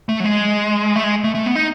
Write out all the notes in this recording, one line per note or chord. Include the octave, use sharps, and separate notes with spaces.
A3
F#3
G#3
A3
G#3
A3
A3
B3
D#4